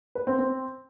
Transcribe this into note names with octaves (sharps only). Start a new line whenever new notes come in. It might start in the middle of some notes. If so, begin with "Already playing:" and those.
B4
C4
C4